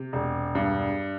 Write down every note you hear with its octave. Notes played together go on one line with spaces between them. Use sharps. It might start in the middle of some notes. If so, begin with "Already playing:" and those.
Already playing: C3
E1
G2